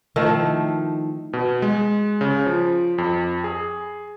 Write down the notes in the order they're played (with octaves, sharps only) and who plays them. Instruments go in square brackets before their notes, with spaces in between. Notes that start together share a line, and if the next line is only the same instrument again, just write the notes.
[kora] D#3 F3 A3 E4
[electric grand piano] B2
G#3
C#3
F3
F2
G#4